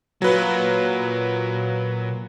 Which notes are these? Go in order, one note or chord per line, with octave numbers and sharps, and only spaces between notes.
A#2 F#3 F4 B4